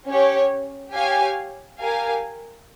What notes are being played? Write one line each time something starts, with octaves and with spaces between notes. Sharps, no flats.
C#4 G4 C#5
G4 C#5 F5 G#5
G4 A#4 F5 G#5